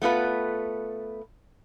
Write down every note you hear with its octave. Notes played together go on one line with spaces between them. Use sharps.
A3 B3 F4 B4